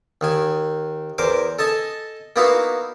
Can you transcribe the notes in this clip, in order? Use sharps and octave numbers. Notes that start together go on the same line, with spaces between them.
D#2 D#3 G#5
E2 A#4 C5 D6
A4 D#5 G#5 A5
A#3 B3 D#4 E4 F#4 F5